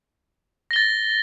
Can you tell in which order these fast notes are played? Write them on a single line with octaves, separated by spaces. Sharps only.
A#6 G7 A6